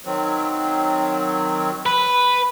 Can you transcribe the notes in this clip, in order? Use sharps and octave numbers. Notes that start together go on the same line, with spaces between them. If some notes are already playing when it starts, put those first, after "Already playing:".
D#3 F#3 C4
B4